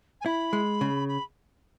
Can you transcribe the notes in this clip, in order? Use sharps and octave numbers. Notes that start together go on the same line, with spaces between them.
G#5
E4 B5
G#3
C#3
B5